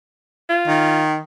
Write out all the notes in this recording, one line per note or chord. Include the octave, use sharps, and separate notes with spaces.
F4
D#3